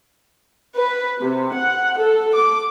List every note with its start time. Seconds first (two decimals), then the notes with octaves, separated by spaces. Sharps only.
0.77 B4
1.20 C3
1.53 F#5
1.98 A4
2.35 D6